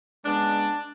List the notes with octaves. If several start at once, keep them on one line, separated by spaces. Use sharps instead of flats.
C#3 G#3 B3 D4